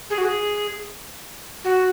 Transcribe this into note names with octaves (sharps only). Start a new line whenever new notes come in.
G#4
F#4
G#4
F#4